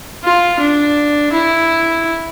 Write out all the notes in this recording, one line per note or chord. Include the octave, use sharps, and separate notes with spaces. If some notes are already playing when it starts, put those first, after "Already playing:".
F4
D4
E4